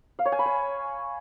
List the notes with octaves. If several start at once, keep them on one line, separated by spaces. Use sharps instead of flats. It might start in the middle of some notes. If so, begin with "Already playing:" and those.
F5
C#5
G#5
B5
G#5